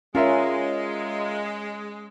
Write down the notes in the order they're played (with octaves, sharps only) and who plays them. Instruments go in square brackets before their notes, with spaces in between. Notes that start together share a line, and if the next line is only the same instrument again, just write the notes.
[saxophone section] G#3 [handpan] C#4 [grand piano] F4 A#4 E5